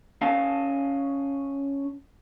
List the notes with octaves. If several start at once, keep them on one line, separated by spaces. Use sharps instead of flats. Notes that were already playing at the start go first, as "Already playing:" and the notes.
C#4 F5 G#5 A5